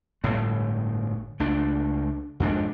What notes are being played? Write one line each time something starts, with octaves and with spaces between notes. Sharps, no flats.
G1 A2 A3
C#2 A3 D4
F2 G#2 D4